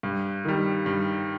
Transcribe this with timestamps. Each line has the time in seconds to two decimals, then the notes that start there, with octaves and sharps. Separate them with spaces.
0.03 G2
0.45 D#3 G3
0.86 G2